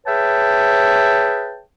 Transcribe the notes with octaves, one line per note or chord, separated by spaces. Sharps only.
G#4 B4 C#5 E5 G5 A5